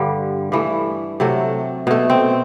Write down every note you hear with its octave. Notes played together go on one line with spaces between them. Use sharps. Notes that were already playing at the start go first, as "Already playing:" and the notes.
Already playing: G2 D3 G3
G2 E3 A3
C3 F#3 A3
B2 A3
C4